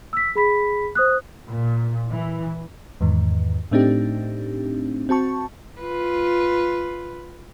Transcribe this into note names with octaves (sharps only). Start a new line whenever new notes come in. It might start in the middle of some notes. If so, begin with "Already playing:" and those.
E6 B6
G#4 B5 B6
C5 D#6 F#6
A#2
E3
E2 G#2 D#3
A2 A3 C4 D4 D#4 G4
C4 F#4 A5 C#6
F4 B4